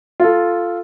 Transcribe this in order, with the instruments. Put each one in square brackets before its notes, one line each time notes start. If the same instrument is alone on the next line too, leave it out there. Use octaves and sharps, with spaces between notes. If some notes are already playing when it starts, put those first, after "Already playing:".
[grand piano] F4 A4